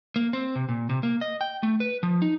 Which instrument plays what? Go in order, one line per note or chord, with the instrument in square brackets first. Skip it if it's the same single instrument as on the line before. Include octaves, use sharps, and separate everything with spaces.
[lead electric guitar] A#3
C4
C3
A#2
C3
A#3
D#5
G5
A3
B4
F3
D#4